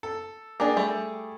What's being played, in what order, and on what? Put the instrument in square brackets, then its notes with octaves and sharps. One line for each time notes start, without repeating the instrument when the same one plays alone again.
[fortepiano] A4
[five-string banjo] A#3 D4 [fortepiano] G#4 G5 D6
[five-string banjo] G3 A3